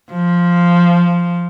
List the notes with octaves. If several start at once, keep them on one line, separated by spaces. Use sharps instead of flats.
F3